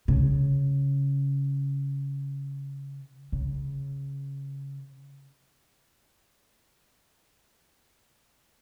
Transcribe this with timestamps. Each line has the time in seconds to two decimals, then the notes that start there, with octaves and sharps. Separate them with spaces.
0.08 C#3
3.32 C#3